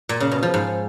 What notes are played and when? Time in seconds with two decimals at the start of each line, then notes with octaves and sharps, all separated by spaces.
0.09 A#2
0.20 C#3
0.32 B2
0.43 F3
0.54 G#2